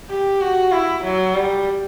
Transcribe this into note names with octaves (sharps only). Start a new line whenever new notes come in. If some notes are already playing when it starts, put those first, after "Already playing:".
G4
F#4
E4
F#3
G3